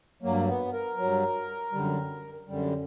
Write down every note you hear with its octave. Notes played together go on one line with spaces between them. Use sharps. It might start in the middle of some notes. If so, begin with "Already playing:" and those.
G2 F#3 A#3
B3
A#4
G2 F#3
F#2 D3 G3
F#2 D3 G3